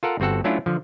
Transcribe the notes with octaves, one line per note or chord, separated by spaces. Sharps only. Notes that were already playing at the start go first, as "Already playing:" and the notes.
F4 A4 A#4 F#5
G1 C4 F#4 A4 F#5
F#3 A3 C#4 D4 E4 F4
D3 F3